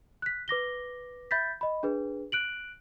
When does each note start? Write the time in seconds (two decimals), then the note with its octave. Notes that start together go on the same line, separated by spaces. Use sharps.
0.22 F#6 B6
0.48 B4 D6 A#6 G7
1.31 E5 B5 G6 A6 B6
1.61 D#5 B5
1.83 D4 G#4 B4
2.32 F#6 D7 F#7